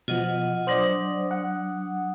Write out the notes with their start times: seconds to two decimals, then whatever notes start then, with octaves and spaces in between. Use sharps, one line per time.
0.08 B2 F3 F4 D#5 F#5
0.67 F#3 D4 C5 D5 D#6
1.31 F#5